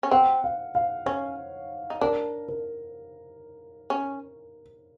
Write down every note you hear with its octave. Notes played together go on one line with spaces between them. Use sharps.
C#4
C4 F#5
F5
F5
C#4 C#5
D#4
D4 A#4
A#4
C#4